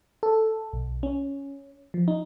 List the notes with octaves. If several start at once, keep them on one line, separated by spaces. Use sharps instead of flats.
A4
B1
C#4
F3
D#4